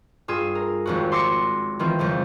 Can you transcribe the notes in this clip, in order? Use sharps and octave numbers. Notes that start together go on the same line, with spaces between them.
G2 F4 G#4 E6
A#4
G#1 F2 F#4
C6 D6 E6 A#6 C#7
D#3 E3 C4 F4
F2 C#3 F3 G3